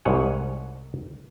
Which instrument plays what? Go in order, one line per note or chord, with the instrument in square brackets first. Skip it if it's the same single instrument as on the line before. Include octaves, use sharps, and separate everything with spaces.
[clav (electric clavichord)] C2 G#2 C#5 F#5 G#5